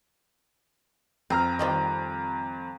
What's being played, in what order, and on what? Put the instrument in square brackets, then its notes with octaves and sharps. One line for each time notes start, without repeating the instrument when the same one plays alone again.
[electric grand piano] F2 A#5 F6 [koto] C4
[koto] D#3 F3 G3